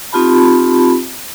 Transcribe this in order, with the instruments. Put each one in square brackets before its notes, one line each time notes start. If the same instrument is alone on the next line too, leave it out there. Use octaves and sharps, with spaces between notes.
[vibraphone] C4 D#4 F4 G4 A5 B5